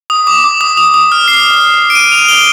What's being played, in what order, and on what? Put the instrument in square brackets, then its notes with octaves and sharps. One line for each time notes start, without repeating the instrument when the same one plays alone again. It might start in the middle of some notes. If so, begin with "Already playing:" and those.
[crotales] D#6
D6
D6
D#6
D#6
D#6
F6
C7
D7
D#7
F7
G7